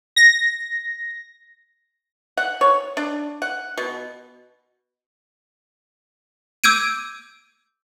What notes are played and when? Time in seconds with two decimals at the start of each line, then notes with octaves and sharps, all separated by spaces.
0.16 A#6
2.37 F#5
2.61 C#5
2.97 D4
3.42 F#5
3.78 B2
6.64 D6 E6 G6 G#6 D7 D#7